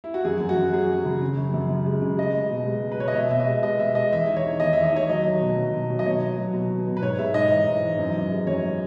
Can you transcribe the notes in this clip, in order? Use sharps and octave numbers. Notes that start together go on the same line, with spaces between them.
E4
F#4
F#2 G#4
F#2
F#4
F#2
F#3 G#4
F#2
C#3
C#3
F#2
F#2
C#3
G#3
C#3
G#3 D#5
G#3
B2
G#3
G#3
B4
B2 C#5
D#5
B2 E5
B2 E5
D#5
G#3
G#3 D#5
B2 E5
G#3 D#5
E2 E5
D#3
C#5
D#3
E2 D#5
E2 E5
D#5
D#3 C#5
F#3 D#5
F#3
B2
F#3
B2
F#3
D#5
B2 C#5
B2
F#3
B2
B2
B2
B4
G#2 C#5
G#3 E5
G#2 D#5
E3
G#2
E3
F#2
F#2
G#3
F#2 C#5